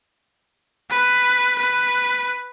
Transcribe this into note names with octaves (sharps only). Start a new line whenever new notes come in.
B4
B4